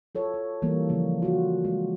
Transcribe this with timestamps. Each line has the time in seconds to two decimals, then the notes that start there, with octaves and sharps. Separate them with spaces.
0.15 F4 A4 C#5
0.34 F4
0.62 E3 G3 A#3
0.89 C#3 F3 A#3
1.22 F4 F#4
1.64 G#3